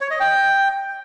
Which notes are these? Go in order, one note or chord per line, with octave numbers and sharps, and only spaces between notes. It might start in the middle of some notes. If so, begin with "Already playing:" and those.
C#5
D#5
G5